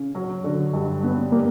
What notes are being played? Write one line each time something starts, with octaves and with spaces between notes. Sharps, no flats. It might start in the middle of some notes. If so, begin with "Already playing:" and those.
Already playing: C#3
F#3
D3
G2
B3
G3 A#3